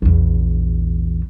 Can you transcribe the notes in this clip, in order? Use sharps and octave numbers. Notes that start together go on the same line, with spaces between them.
A#1 E2